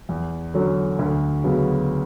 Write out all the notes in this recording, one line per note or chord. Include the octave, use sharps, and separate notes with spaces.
E2
D3 F#3 C#4
D2
C#3 F#3 B3